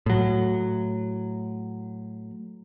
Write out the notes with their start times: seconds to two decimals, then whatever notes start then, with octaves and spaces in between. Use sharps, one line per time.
0.06 A2 F#3